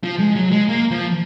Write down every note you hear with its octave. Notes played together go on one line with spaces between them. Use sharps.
F3
G#3
F#3
G#3
A#3
F3